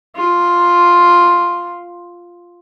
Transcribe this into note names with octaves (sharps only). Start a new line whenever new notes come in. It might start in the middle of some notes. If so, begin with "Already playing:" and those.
F4